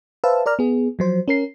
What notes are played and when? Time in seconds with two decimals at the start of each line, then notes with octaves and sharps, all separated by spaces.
0.24 B4 C5 E5 F5 A5 E6
0.46 A#4 D5 A#5 F6
0.59 B3 G#4
0.99 F3 F#3 C5
1.28 C#4 A#4 C7